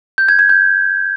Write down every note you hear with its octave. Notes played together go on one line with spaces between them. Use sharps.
G6
G#6
G#6
G6